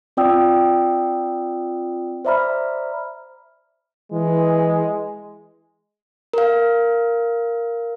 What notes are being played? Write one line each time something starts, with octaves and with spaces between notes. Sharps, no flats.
C4 F4 D5 G5 D#6 E6
C5 D5 E5 A#5 B5 F6
E3 G#3
A#4 F5